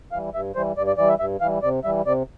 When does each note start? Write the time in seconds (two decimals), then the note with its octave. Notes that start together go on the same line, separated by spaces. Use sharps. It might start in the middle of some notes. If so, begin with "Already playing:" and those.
0.12 E3 G3 F5
0.34 G2 E5
0.55 E3 G3 C5
0.76 G2 D5
0.87 D5
0.98 E3 G3 D5
1.09 E5
1.19 G2 E5
1.41 E3 G3 F5
1.63 C3 D5
1.84 E3 G3 E5
2.06 C3 D5